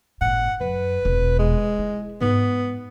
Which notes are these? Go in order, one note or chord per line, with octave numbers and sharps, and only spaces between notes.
G1 A2 F#5
F#2 B4
E1 B2
G#3
E4
G#2 B3